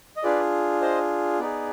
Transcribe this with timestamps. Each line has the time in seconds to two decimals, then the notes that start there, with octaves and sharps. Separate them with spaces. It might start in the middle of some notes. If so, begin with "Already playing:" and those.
0.17 D#5
0.23 D4 F4 G#4 B4 D5
0.81 C5 D#5
1.39 B3 D#4 G#4 B4 D5